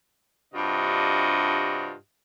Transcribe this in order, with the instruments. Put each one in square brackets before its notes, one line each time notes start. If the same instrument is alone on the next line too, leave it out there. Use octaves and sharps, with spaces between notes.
[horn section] G2 C3 D4 F4 F#4 D#5